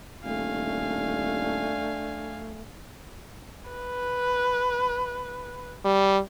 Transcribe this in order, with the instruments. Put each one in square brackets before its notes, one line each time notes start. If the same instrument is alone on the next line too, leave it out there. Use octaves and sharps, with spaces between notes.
[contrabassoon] D#1 [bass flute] A3 [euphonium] D4 [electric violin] F5 G#5
[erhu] B4
[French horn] G3